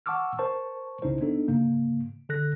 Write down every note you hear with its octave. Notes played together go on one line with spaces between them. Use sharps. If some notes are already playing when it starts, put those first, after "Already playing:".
F#5 A5 C#6 D6 E6 F6
A#4 C5 A5 C#6
C2 C#3 C#4 D#4 E4 C5
B3 D4 D#4 A4
G#2 C#3 A#3
D3 A4 F#6 A#6